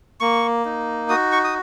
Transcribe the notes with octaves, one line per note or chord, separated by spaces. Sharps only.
A#3 C#6
D#4
F#4 D#6
C#6
D#6